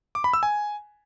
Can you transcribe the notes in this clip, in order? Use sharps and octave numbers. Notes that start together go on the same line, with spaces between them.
D6
B5
E6
G#5